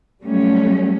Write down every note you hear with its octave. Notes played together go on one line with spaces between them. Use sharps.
F#3 G3 A3 C#4